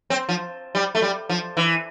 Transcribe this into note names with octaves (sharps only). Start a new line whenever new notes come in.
C4
F3
G3
A3
G3
F3
E3